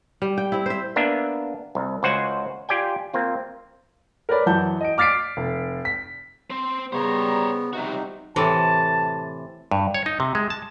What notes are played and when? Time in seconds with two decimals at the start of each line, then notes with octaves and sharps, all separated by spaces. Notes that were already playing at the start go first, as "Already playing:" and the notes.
0.22 G3
0.38 G5
0.52 C4 E4
0.66 C5 E5
0.96 A#3 B3 D4 E5
1.75 C2
2.03 C#2 F#4 C5 F#5 G#5
2.69 F4 G4 D5 G5 G#5
3.13 A#3 C4 F4
4.29 A#4 B4 C#5 D5 B5
4.46 F#2 E3 F#3 F#5 A5 G6
4.81 D#5 D7
4.98 D6 F6 A6 B6 C7 D7
5.37 F1
5.85 B6
6.50 C4 C5
6.92 C#3 G3 B3 C5 C#5 A#5
7.73 C3 G3 D#4 F#4
8.36 A2 C3 E3 A5
9.72 G2
9.94 C#5
10.06 D#4
10.20 C3
10.35 G#3
10.50 A5